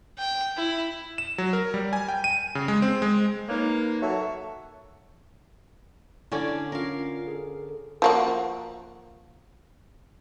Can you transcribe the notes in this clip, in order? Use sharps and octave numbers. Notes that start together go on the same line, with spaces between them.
G5
E4
E7
F#3
A#4
G3
G#5
G5
D#7
C#3
G#3
C4
G#3
A#3 D#4 B4 C#5
F#3 A4 E5 C#6
D3 C#4 E4 C#5 D5 G#6
C#4 F4 A#4 F5
G#4 A4
F3 A#3 F#4